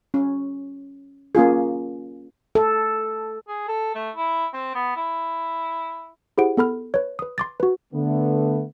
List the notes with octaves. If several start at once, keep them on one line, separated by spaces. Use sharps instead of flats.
C#4
A#3 C#4 F4 G#4
A4
G#4
A4
A3
E4
C4
B3
E4
E4 G4 G#4 C5 F#5 D7
B3 A4 B5 F6
B4 C#5
B4 D#6
C6 D6 A6
F#4 B4
D3 A3 B3